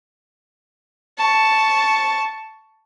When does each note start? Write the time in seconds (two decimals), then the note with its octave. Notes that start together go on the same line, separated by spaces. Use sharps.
1.18 A5 C#6